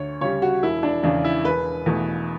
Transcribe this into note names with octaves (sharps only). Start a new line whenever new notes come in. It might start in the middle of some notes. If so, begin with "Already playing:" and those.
Already playing: D2 C#5
C#3 G3 C#5
F#4
E1 E4
D4
E2 C#3 D4
E4
E1 B4
E2 B2 A3